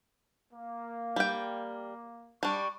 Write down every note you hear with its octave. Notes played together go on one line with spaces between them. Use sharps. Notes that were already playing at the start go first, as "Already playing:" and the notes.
A#3
G3 G5
G3 D4 C#6